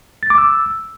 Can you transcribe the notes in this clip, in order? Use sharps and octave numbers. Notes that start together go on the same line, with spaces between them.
A6
D6
E6